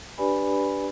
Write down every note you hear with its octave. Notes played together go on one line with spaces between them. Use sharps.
D4 G4 B4 D5 G#5 B5